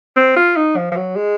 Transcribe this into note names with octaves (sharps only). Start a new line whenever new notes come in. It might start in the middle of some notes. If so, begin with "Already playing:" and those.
C4
F4
D#4
F3
F3
F#3
G#3